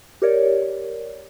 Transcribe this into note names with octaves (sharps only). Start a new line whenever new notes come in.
G4 A#4 C#5 D5